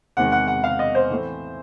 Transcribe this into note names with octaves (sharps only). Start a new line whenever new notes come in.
E2 C3 D#3 G#3 F#5
F#5
F#5
F5
D#5
C5
A2 E3 A3 C4